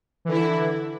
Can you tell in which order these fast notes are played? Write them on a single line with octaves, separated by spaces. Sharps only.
E3 D3 E4